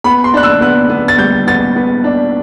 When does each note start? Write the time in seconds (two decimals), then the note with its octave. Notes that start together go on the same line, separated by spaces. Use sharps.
0.04 B3 B5
0.24 C6
0.34 D4 F#6
0.43 E6
0.61 B3 F#6
0.90 B3
1.08 A6
1.18 G3 G6
1.47 B3 A6
1.76 B3
2.04 D4